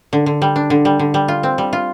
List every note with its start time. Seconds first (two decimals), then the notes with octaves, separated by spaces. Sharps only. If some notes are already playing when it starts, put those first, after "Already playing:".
0.13 D3
0.26 D3
0.42 G3
0.56 D4
0.70 D3
0.85 G3
0.99 D3
1.14 G3
1.28 F4
1.43 C4
1.58 G3
1.73 F4